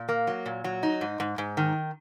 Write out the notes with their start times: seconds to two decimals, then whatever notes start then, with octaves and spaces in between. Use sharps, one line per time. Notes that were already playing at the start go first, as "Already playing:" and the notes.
Already playing: A#2
0.09 A#3
0.27 F#3
0.46 A#2
0.64 F#3
0.83 D#4
1.01 G#2
1.20 G#2
1.38 G#2
1.57 D#3